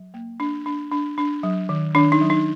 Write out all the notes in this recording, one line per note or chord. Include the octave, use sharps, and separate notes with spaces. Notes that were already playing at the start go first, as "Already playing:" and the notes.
Already playing: F#3
A#3
D4
D4
D4
D4
F#3
D#3
D#3 D4
D#4
F#3
D#4